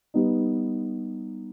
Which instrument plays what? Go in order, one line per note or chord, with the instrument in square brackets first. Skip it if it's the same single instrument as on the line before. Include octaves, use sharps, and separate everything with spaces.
[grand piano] G3 B3 D#4